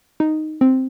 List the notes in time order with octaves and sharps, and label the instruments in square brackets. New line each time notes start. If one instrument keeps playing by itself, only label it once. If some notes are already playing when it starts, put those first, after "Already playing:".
[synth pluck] D#4
C4